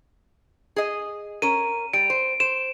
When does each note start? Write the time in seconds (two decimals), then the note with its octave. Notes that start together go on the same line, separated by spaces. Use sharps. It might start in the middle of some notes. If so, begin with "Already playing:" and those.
0.76 G#4 D#5
1.42 C#4 A#4 D#7
1.93 G3 D7
2.10 C5
2.40 C5 E7